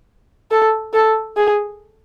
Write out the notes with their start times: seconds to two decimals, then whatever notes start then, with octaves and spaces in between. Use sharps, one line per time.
0.51 A4
0.93 A4
1.37 G#4